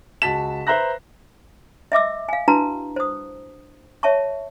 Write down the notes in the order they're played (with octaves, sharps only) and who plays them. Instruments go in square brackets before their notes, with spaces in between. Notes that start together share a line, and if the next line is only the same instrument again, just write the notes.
[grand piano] C#2 F#4 A5 B6 E7
B4 C5 E5 A#5 F#6 A#6
[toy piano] D#5 E5 D6 E6
F5 G#5
D4 E4 F#4 B4 A5 A#5
C5 D#6
C#5 E5 A5 C#6